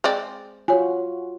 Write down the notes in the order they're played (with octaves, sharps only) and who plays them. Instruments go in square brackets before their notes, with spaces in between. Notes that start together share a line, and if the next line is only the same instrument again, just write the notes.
[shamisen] G#3 C4 D5
[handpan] F4 F#4 [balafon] C#5 G#5